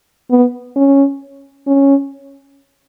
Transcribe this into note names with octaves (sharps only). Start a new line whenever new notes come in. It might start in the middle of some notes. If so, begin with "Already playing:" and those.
B3
C#4
C#4